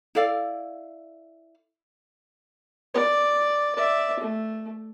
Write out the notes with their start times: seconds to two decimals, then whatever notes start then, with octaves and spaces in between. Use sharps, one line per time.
0.15 E4 A4 D5 F5
2.94 D5
3.75 D5 E5
4.20 A3